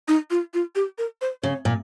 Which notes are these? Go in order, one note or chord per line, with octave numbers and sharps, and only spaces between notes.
D#4
F4
F4
G4
A#4
C5
C#3 C#5
A#2